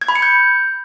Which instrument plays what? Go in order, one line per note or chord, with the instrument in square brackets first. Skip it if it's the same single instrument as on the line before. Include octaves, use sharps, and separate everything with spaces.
[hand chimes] G#6
B5
C#7
G6